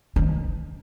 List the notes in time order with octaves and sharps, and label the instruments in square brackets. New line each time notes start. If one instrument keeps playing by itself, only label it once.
[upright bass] D#3